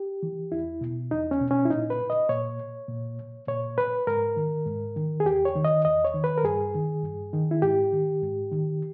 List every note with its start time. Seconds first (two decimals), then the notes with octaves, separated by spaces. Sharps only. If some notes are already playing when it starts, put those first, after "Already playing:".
Already playing: G4
0.23 E3
0.52 E2 E4
0.81 B2
1.11 E2 D#4
1.31 C#4
1.40 B2
1.51 C#4
1.65 E4
1.70 A#2 D#4
1.90 B4
2.10 D#5
2.29 A#2 C#5
2.88 A#2
3.48 A#2 C#5
3.78 B4
4.07 G#2 A#4
4.36 D#3
4.66 G#2
4.97 D#3
5.20 G#4
5.25 E2 G4
5.45 C#5
5.56 D#3
5.65 D#5
5.85 E2 D#5
6.05 C#5
6.14 D#3
6.24 B4
6.38 A#4
6.43 G2 G#4
6.74 D#3
7.03 G2
7.33 D#3
7.51 E4
7.62 G#2 G4
7.93 D#3
8.22 G#2
8.52 D#3